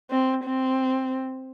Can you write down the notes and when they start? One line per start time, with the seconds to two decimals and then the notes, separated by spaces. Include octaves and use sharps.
0.10 C4
0.45 C4